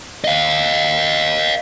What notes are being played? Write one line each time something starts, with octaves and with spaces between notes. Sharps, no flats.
D#5 F5